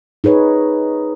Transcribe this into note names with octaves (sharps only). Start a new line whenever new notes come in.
D#4 G#4 B4 C#5